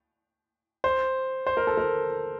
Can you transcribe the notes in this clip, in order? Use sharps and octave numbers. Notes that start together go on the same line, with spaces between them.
C5
C5
A#4
A4
A#4